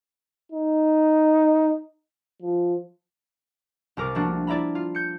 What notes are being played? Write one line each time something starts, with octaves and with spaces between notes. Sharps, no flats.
D#4
F3
C2 C3 A#4 D6 D7
F3 A3 A#3 C4 D4 F#4
E4 D5 E5 A#5 B5
F4
G6 C#7